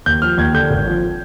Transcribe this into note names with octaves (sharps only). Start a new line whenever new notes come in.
D#2 G6
F3 F6
D#2 G#6
D3 G6
G#1
F3